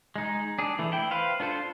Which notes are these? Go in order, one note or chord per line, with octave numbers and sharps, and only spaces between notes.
G#3 D#4
D4 G#4
E3 A3
E4 G5
B4 C5 F5
D4 F4 A4 C5